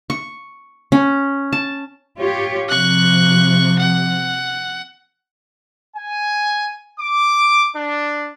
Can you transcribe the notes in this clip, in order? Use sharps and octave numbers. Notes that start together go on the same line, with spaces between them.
C#6
C#4
A5
F4 G4 C#5
C3 F3 C#6 F#6
F#5
G#5
D6
D4